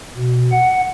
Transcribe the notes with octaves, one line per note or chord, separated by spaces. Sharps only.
B2
F#5